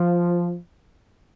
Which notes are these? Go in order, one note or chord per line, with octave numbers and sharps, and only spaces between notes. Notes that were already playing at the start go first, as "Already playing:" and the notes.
Already playing: F3